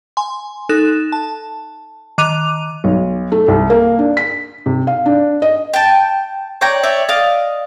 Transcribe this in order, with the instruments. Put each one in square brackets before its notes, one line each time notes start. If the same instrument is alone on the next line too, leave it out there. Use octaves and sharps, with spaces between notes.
[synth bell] G#5 C6
D#4 A4 F#6 E7
A5
D#3 D6 F#6 D#7 F7
[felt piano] B1
A3
C2
A#3
D4
B6
C3
F5
D4
D#5
[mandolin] G5 A5
C#5 D5 G5 A#5
C#5 D5 E5
D5 D#5 F5